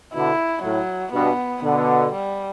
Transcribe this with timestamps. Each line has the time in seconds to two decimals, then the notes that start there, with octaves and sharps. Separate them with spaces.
0.14 B2 D3 E4
0.64 A2 F#3
1.13 G2 B2 B3
1.63 B2 D3 B3
2.12 G3